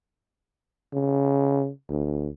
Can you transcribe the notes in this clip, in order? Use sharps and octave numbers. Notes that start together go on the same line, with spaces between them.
C#3
D2